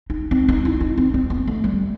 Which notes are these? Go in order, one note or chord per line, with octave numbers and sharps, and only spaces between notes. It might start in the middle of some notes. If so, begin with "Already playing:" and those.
D#4
C4
D#4
E4
D#4
C4
C4
B3
A3
G3